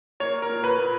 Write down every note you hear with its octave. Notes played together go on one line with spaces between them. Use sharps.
A#3 C#5
A#4
A#2
B4
A#2